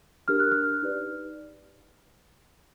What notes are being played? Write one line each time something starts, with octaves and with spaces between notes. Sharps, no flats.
D4 G4 A#4 F6
F#6
F6
D#4 G4 B4 D5